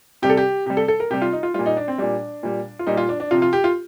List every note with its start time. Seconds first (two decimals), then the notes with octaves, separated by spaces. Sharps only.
0.22 C3 G3 G4
0.30 A4
0.37 G4
0.66 C3 G3 G4
0.77 A4
0.88 A4
1.00 A#4
1.10 C3 G3 G4
1.22 F4
1.32 D#4
1.43 F4
1.54 A#2 G3 F4
1.66 D#4
1.77 D4
1.88 C4
1.98 A#2 G3 D4
2.43 A#2 G3
2.79 F4
2.87 A#2 G3 D#4
2.97 F4
3.09 D4
3.20 D4
3.31 C3 F3 F4
3.42 F4
3.53 G4
3.64 F4